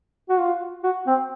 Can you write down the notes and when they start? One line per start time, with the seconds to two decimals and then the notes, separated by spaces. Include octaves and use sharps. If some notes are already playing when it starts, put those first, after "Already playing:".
0.29 F#4
0.38 F4
0.83 F#4
1.07 C4